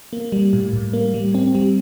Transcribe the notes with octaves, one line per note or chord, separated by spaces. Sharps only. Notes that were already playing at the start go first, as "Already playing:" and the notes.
A#3
G3
A2
A2
A#3
G3
C4
G3